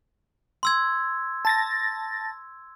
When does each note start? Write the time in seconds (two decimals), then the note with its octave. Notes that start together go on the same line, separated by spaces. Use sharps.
0.63 C6 E6 G#6
1.45 A5 A6 A#6